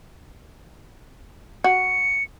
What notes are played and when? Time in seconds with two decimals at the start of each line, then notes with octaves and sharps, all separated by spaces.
1.64 F#4 C#7